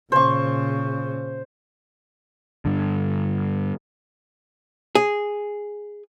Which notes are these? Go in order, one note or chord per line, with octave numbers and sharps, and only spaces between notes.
A#2 C#3 C5 C#6
G2 D3
G#4